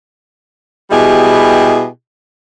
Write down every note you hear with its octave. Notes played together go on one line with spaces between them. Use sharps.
B2 G3 E4 G4 G#4 D#5